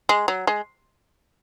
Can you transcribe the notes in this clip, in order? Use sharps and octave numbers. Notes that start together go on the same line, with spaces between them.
G#3
F#3
G#3